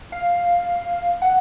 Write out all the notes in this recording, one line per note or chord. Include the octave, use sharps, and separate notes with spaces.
F5
F#5